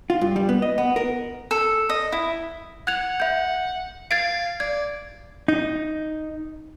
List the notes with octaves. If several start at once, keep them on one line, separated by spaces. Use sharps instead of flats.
F4
G2
G3
B3
D#5
B3
A#4
A4
D#5
E4
F#5 F#6 G#6 F7
E5 G6
F5 G#6 A6 D7
D5 G#6
D#4